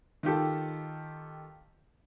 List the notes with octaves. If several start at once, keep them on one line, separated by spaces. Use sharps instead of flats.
D#3 F4 G4 A4